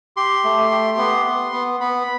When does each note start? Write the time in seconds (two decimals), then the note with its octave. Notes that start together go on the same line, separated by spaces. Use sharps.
0.17 G4 C6
0.44 A3
0.71 G4
0.98 B3
1.26 B3
1.52 B3
1.80 B3 B5